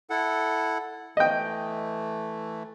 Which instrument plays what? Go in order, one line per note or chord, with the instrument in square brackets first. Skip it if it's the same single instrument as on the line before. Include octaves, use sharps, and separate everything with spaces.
[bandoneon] E4 A4 F#5
[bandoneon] E3 A3 [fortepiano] D#5 G5